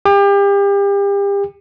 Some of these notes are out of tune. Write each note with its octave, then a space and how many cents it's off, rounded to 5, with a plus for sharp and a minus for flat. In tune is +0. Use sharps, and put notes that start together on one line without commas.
G4 +35